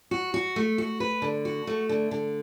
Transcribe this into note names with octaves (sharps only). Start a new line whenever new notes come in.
F#4
F#4
A3
F#4
B4
D3
F#4
A3
D3
D3